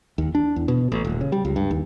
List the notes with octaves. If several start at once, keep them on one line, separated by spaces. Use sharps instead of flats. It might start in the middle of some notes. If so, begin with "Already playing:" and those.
D#2
D4
E2
B2
A1
D#1
C#3
G3
C#2
G2
D#2